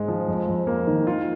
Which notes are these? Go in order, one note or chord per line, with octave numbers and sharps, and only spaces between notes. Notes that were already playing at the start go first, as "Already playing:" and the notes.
Already playing: G#2 G#3 D#4
F3
F2
F2
A#3
D#3
F4